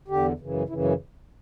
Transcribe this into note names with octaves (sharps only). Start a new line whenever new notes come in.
E2 D3 G4
F#2 C#3 E3
F#2 C#3 E3 E4
C#4